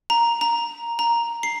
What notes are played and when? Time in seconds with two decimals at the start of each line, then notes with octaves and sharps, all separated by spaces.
0.10 A#5
0.41 A#5
0.99 A#5
1.43 C7